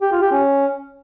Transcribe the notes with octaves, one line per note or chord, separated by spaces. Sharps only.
G4
F4
G4
C#4